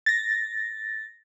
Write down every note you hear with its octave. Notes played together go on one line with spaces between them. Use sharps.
A6 A#6